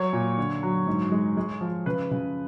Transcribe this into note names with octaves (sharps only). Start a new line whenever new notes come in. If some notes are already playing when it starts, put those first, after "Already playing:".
Already playing: F#3 C#5
A#2
D3
F#3
G#2
G#3
G#3
F3
C#3 B4
C#3